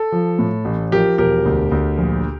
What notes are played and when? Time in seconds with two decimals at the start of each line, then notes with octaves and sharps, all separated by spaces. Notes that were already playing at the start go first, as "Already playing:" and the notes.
Already playing: A4
0.12 F3
0.39 A2
0.65 A1
0.92 F3 G4 A#4
1.18 E1 G4 A#4
1.45 D2
1.72 D2
1.98 A#1